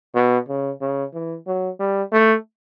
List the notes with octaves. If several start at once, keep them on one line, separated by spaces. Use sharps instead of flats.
B2
C#3
C#3
E3
F#3
G3
A3